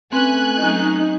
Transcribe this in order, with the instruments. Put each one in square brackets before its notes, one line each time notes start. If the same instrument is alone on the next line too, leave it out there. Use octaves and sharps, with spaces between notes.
[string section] A3 G#5 F#6 [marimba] C4 [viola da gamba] C#4 B4
[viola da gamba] F#3 C#4 [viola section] D#4